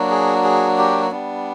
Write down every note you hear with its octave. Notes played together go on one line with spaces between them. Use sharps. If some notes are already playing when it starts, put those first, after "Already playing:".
Already playing: F#3 A#3 D4 F#4
G#4
G#4
G4
G3 B3 D4